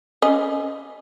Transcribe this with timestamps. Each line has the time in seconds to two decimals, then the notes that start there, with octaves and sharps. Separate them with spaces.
0.22 C#4 D#5